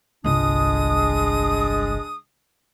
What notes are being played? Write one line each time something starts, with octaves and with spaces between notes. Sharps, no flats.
G1 C2 G#3 D4 D#6